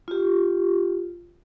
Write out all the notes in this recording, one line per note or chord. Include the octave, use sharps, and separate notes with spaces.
F4 G4